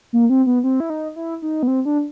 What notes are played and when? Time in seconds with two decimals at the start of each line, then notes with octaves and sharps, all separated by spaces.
0.13 A#3
0.30 C4
0.46 B3
0.64 C4
0.80 E4
0.90 D#4
1.16 E4
1.42 D#4
1.63 B3
1.68 C4
1.85 D4